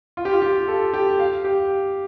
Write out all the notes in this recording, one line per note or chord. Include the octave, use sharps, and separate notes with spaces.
F4
G4
F4
G4
A4
G4
F5
G4